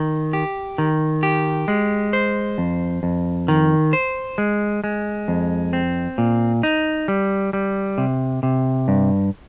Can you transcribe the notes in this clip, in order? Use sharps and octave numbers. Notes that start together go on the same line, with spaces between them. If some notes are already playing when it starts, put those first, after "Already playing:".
Already playing: D#3
G4
D#3
G4
G#3
C5
F2
F2
D#3
C5
G#3
G#3
F2
C4
A#2
D#4
G3
G3
C3
C3
G2